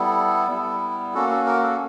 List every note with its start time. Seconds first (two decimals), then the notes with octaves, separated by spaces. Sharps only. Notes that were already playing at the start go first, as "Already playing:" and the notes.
Already playing: G3 B3 E4 A4
0.50 G3 B3 E4
1.14 A#3 C#4 F#4 A4
1.30 A4
1.46 A#4
1.63 A4